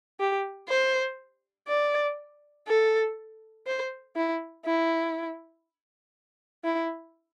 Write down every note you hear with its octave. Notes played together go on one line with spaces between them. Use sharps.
G4
C5
D5
A4
C5
E4
E4
E4